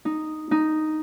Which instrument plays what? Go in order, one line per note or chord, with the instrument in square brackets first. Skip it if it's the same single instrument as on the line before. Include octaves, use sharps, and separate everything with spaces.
[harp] D#4
D#4